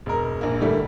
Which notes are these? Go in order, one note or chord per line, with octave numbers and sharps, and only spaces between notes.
E1 A#4
A#1 A#3
A2 D3 G3 A3 A#3